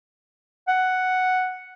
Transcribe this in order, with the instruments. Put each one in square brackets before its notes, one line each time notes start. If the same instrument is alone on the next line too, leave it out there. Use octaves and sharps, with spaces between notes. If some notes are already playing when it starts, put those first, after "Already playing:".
[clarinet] F#5